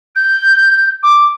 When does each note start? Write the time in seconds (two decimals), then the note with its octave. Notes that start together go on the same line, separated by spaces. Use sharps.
0.15 G6
1.03 D6